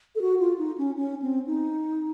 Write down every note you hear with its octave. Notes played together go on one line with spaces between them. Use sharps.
A4
F#4
F4
D#4
C#4
C#4
C4
D#4